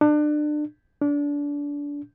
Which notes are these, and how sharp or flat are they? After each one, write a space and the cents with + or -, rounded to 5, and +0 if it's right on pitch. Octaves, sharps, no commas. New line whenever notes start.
D4 +30
D4 -25